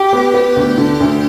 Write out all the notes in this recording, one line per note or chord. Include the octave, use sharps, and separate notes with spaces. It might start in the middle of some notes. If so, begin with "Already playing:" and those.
Already playing: G4
B3
B3
D2
D3
D2